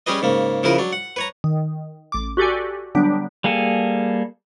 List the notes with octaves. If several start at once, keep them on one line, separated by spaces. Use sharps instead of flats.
G3 C#4 G4 G#4 B4 D#5
G#2 C#3 A#3
C#3 F3 E4 A#4 B4
F#3 D4
F#5
B4 C#5 A#5
D#3
A1 D6
F#4 G4 A4 D5 G#5
D3 F#3 G3 B3 D4
G3 A#3 G#4 A4